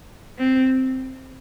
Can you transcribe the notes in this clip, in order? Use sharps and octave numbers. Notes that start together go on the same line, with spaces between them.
C4